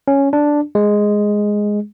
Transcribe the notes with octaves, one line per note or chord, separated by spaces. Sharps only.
C#4
D4
G#3